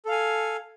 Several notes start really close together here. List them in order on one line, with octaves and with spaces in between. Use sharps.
A4 F5 G#5